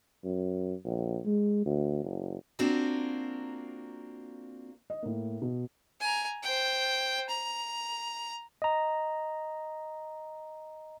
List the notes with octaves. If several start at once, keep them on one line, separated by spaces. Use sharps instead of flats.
F#2
A#1
G#3
D2
F#1
A#3 C4 D4 F4 F#4 A#4
D#5
A2 A#3
B2
G#5 A#5
C5 G5
A#5
D#5 A#5